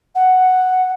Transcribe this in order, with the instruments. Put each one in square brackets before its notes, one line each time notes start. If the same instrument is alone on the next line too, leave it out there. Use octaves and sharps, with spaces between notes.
[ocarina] F#5